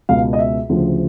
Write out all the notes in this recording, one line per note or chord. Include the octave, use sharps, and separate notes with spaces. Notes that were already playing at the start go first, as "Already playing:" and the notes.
C#2 B2 F5
D#5
E5
D2 C#3 F3